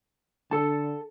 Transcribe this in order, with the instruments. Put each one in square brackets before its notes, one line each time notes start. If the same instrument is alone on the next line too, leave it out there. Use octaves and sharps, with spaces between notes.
[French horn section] D3 [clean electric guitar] A4 A5